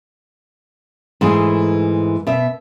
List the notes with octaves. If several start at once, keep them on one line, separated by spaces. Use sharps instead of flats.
G#2 E3 A3 G#4
B2 E5